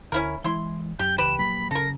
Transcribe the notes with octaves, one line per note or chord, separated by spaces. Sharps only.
D2 C#4 E4 A#4
E3 G#3 E4 C6
F#2 G4 G6
C#2 E3 G4 B4 E7
A#1 F#3 A#3 B5
F#1 C#3 C#4 A4 A#4 A#6